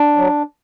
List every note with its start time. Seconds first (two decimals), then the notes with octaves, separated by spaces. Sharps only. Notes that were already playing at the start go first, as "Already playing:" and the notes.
Already playing: D4
0.16 F#3